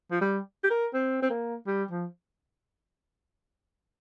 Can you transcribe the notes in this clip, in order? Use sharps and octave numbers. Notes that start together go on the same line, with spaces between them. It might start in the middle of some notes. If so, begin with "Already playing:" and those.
F3
G3
G4
A#4
C4
C4
A#3
G3
F3